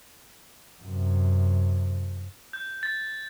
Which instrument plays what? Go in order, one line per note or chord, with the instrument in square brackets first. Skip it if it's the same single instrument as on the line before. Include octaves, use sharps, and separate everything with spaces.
[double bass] F#2 C3
[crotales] G6
A6